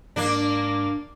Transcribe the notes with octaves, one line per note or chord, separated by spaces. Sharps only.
G#2 A#3 D4